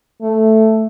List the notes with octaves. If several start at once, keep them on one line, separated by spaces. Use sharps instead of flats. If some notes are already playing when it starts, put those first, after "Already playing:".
A3